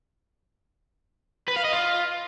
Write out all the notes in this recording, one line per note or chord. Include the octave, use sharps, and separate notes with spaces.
B4
F5
D#5
F4